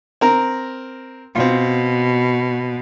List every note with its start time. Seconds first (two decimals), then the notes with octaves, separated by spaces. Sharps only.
0.21 C4 A#4 A#5
1.35 B2 C4 F4